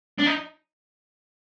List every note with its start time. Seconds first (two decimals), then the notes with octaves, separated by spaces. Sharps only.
0.19 D4
0.26 D#4